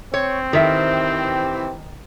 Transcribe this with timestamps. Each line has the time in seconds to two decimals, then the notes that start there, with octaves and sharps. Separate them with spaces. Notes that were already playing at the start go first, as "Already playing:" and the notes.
0.14 C4 C#5
0.53 D#3 E3 G4 A#4 C5 E5